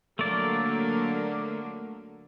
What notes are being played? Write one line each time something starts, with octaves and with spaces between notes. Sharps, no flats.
D3 F#3 A3 A#3 D5